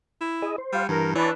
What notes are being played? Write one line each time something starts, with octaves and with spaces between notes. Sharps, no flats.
E4
G#4 D#5
C5
G3 F4 F#5
G2 E3 A#4
E3 D4 B4 C#5 D5 A5 E6